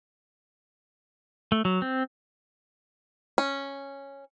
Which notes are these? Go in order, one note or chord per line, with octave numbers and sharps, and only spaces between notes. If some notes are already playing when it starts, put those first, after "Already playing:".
A3
F#3
C4
C#4